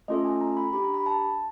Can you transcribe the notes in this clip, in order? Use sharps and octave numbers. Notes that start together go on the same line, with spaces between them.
A3 C#4 F4 A4 D#5
G#5
A#5
B5
D4 G4 B5
A#5
B5
A5